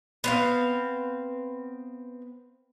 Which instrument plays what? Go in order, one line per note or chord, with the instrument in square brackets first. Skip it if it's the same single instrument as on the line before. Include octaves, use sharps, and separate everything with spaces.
[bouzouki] B3 C4 F5